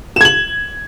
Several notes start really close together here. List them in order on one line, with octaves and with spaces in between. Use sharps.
E7 G#6 F#7